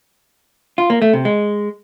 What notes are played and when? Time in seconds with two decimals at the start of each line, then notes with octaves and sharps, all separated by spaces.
0.78 F4
0.90 A#3
1.02 A3
1.13 C3
1.25 G#3